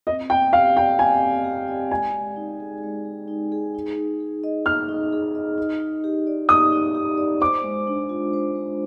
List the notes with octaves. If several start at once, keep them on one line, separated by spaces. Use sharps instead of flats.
C4 D#5
C4 G5
G4 F5
D5 G5
C4 G#5
C4
G4
D5
G#3 G#5
G#3
D#4
G#4
G#3
G#3
D#4
G#4
D#4
D#4
G#4
D#5
D#4 F6
D#4
G#4
D#5
D#4
D#4
G4
D5
D#4 D#6
D#4
G4
D5
C5 D6
G#3
D4
F4
C5
G#3